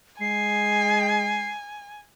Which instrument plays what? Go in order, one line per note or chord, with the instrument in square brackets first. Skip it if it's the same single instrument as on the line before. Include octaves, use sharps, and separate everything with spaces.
[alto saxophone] G#3 [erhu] G#5 [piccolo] C7